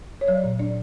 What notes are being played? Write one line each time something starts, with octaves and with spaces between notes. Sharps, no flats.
C#5
F#3 D5
A#2
D4 D5